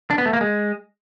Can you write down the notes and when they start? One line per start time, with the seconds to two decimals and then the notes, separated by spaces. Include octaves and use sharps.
0.10 D4
0.18 B3
0.26 A3
0.33 A#3
0.41 G#3